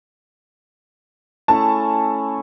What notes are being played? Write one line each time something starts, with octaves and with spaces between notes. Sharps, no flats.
A3 C#4 E4 A5